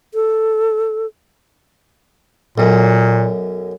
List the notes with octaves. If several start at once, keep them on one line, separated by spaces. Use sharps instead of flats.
A4
B1 F#2 A#2